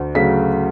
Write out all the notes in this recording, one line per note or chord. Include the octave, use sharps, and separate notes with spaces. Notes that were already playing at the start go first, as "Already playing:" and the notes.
Already playing: D2
C#3 F#3 A3 B6